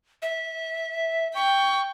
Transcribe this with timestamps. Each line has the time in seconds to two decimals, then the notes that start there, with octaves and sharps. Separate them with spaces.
0.22 E5
1.35 G5 C#6